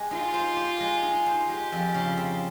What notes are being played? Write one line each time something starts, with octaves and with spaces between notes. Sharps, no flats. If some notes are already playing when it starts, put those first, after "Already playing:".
Already playing: G#3 G4
D#4 F4
C5
G4
G#3
D#4
C5
G#3 G4
F2
C#3
C4